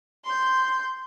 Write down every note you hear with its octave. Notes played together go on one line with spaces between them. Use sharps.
C6 G6